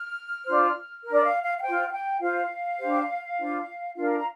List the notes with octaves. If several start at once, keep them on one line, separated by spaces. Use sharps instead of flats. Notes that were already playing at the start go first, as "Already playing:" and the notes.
Already playing: F6
D4 F4 C5
A#4
D4 D5
F5
F5
F5
C5 G5
F4
F5
G5
F4 C5 F5
D4 G4 C5
D4 F4 C5
D4 F4 A#4 F5
A#5